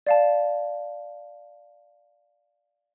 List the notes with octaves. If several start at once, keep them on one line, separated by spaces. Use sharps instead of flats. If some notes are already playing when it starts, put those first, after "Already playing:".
D5 F5 A5